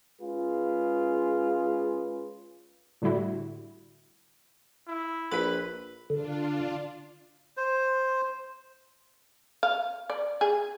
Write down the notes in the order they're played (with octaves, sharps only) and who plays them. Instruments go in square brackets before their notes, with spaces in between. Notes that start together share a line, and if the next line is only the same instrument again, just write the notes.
[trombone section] G#3 C#4 F4 G#4 B4
[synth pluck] A2 D3 G3 E4 F#4
[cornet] E4
[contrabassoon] A#1 [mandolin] B4 B5
[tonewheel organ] D3 [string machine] D4 F4
[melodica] C5
[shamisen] F5
D5
G#4